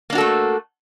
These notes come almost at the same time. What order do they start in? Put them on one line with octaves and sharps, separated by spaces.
A#3 D4 F#4 A4 A3